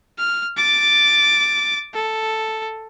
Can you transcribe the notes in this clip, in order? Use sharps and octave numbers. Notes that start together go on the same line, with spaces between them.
F6
D6 A6
A4